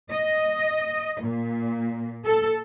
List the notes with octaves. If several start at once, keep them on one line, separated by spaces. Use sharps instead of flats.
D#5
A#2
A4